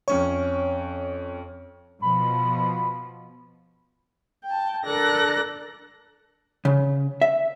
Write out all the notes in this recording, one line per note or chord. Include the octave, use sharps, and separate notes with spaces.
F2 C#4 C#5 C#6
B2 F3 B5
G5 A5
D3 A4 A#4 D5 F#6 A#6
C#3
E5